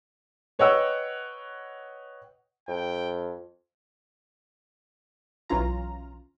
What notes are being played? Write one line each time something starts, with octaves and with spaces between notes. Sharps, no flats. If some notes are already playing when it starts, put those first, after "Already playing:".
B4 C#5 D#5 F#5 G5 E6
F2 G5
B1 E3 C#4 F4 A#5